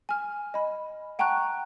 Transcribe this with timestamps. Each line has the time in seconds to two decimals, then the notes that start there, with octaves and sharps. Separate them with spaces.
0.09 G#5 F6
0.54 D#5 B5
1.19 F#5 G5 A5 A#5 C#6 F#6